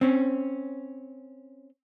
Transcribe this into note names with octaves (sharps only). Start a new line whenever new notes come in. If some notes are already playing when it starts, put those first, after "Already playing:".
C4 C#4